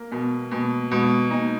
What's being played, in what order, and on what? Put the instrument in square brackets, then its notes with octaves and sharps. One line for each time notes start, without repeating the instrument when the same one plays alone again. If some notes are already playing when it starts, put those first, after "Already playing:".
Already playing: [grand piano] A#3
[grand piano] B2 [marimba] B3
[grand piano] B2 [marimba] A#3
[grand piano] B2 [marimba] G#3
[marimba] A#3 [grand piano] D#4